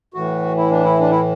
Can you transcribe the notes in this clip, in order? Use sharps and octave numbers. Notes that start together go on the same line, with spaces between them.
A2 E3 F#4
E4
D4
E4
D4
E4